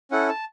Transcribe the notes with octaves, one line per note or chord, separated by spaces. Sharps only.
C#4 E4 A4 F#5
A5